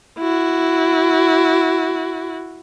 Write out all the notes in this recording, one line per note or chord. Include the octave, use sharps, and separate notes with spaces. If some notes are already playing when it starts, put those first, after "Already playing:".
E4 F#4